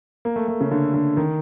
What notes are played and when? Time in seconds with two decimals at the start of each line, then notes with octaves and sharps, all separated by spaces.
0.25 A#3
0.36 A3
0.48 A3
0.61 C#3
0.71 D3
0.94 D3
1.17 D#3